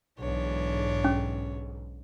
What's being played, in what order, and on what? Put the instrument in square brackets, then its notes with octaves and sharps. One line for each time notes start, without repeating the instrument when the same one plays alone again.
[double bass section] B1 G#2 [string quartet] E3 D4 C#5
[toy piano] C#4